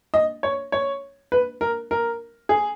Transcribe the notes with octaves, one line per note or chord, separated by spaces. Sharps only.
D#5
C#5
C#5
B4
A#4
A#4
G#4